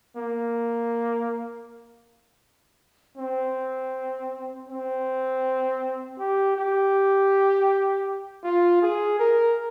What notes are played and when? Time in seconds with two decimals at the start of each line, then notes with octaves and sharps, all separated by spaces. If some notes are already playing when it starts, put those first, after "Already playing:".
0.16 A#3
3.17 C4
4.68 C4
6.19 G4
6.56 G4
8.44 F4
8.82 G#4
9.20 A#4